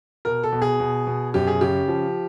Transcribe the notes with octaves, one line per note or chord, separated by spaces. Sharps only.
B2 A#4
A4
B2
G#4
B2
B2
F#2 G4
G#4
C#3 G4
F3